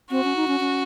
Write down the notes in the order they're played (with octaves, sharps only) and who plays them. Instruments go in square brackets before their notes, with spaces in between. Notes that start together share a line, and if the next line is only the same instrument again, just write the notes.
[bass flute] C4 [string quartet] F#4
[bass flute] C#4
D#4
C#4
C#4